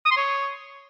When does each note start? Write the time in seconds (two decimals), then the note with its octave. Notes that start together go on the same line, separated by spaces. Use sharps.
0.05 D#6
0.11 C6
0.17 C#5